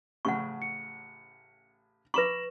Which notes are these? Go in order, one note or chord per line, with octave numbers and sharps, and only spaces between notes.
A1 A2 C#3 F#5 C#6
C#7
B4 A#5 B5 C#6 D6 A#6 E7 F#7